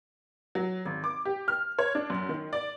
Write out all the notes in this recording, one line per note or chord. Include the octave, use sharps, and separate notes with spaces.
F#3
G#1
D6
G4
F6
C#5
D4
F#2
D#3
D5